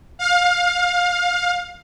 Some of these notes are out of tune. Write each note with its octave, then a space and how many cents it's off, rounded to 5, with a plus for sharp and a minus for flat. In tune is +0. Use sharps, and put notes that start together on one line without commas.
F5 +25